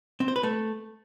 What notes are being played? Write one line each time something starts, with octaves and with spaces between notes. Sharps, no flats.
C4
C5
B4
A3